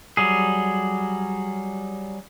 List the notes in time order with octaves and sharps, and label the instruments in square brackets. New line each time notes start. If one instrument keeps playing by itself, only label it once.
[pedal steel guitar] F#3 G3 G#4